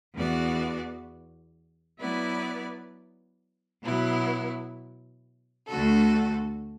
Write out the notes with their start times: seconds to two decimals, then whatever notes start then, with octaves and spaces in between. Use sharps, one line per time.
0.14 E2 E3 B3 F#4 D5
2.00 F#3 B3 E4 B4 D5
3.83 B2 F#3 B3 E4
5.68 D2 D3 A3 F#4 A4